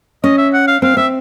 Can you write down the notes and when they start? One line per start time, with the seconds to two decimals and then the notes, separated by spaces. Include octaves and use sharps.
0.24 C#4 D#5
0.38 E5
0.53 F#5
0.67 F5
0.82 C4 F5
0.97 C4 E5